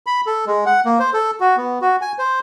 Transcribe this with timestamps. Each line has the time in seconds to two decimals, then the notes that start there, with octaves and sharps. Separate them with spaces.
0.06 B5
0.27 A4
0.46 G#3
0.66 F#5
0.85 A#3
0.99 C5
1.14 A4
1.40 F#4
1.57 B3
1.81 F#4
2.02 G#5
2.19 C5